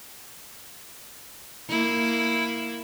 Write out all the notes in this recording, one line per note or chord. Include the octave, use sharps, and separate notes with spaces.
A#3 E4